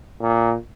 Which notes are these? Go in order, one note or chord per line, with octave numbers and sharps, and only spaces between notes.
A#2